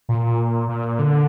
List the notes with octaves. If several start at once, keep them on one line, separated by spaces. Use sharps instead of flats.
A#2
A#2
D3